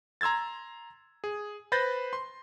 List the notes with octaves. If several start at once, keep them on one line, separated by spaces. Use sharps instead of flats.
A#5 C6 E6 G#6 A6
G#4
B4 C5 B5 G6 A6 A#6
C6